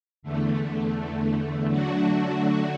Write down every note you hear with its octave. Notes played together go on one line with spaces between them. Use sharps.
E2 D3 A3
D3 F#3 A3 D4 F#4